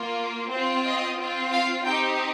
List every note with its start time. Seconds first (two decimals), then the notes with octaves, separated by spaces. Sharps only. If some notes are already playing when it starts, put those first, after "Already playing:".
Already playing: A#3 F4
0.51 C4 F4 C5
0.85 D#5
1.18 C4 F4
1.52 F5
1.85 C4 D#4 G4 G5